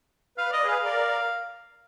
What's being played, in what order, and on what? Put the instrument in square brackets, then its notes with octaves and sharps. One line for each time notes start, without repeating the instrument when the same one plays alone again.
[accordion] B4 [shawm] F5
[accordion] D5 [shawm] D#5
[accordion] G#4 B4
[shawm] F5
[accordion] A#4 D5